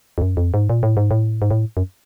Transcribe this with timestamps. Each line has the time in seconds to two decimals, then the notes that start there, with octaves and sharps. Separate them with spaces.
0.18 F2
0.22 F#2
0.37 F2
0.54 G#2
0.70 A#2
0.83 A2
0.97 G#2
1.11 A2
1.42 G#2
1.51 A2
1.77 F#2